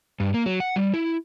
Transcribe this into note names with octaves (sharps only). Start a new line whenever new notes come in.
G2
A#3
F#3
F#5
G3
E4